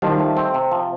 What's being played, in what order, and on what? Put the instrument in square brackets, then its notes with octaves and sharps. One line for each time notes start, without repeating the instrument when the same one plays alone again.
[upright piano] D#3 G3 [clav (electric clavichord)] F3
[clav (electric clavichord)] A3
C4
C3
F3